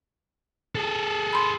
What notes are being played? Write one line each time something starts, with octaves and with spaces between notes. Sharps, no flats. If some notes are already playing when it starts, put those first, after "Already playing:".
G#4 A4
B5 C6